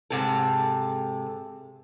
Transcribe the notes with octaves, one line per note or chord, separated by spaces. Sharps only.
G#2 C3 A4